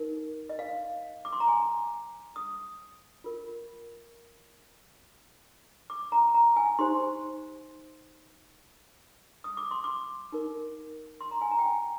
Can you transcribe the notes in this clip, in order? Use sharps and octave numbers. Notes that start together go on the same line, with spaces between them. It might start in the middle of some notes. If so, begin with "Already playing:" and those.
Already playing: D#4 A#4
D#5
F5
D6
C6
A#5
G#5
D#6
F4 A#4
D6
A#5
A#5
G#5
D#4 G4 C5 C6
D#6
D6
C6
D6
D#4 A#4
C6
A#5
G#5
A#5
G5
G#5